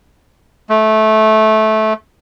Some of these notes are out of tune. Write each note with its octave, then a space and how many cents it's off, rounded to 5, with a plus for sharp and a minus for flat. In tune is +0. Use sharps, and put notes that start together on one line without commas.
A3 -15